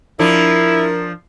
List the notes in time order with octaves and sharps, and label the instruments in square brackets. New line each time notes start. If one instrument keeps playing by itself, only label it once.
[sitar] F3 D4 [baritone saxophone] E4 [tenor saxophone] A#4